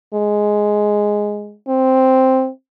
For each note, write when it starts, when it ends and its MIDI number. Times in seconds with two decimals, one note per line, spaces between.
0.14 1.55 56
1.68 2.49 60